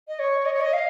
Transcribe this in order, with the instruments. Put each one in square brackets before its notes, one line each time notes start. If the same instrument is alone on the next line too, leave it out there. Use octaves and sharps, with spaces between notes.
[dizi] D#5
C#5
D#5
C#5
D#5
F5